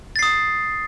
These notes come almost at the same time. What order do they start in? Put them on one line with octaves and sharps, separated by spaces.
A6 C7 D#6